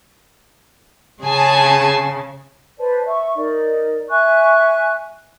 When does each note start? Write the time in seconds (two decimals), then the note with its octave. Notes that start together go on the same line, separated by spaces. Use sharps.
1.23 C#3 G#4 G#5 A5
2.79 B4 C5 D5 A5
3.06 E5 C#6
3.36 D#4 A#4 D5
4.10 E5 G#5 C#6 F#6